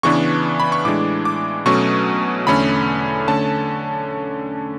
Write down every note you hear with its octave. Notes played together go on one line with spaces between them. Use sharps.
C#3 E3 B3 D4 C#6
B5
C#6
A2 E3 G#3 D4 D6
D6
B2 F#3 A3 C#4 C#6
E2 D3 A3 C#4 B5
D3 A3 C#4 A5